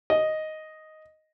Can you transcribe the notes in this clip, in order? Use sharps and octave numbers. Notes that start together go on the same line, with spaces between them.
D#5